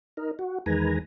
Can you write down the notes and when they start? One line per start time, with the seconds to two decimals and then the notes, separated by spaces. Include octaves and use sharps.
0.17 D#4 A#4
0.39 F#4
0.66 E2 D#3 G#3 B4 G#5 A#5